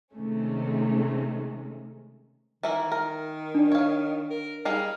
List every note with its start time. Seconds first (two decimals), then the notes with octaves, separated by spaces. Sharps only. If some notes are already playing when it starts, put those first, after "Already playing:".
0.13 C3 D#3 G#3 A3 C#4
2.63 D#3 E3 E4 A#4
2.92 A#4
3.55 D4 D5
3.72 C#5 F5
4.30 A#4
4.65 G3 D#4 G#4 F5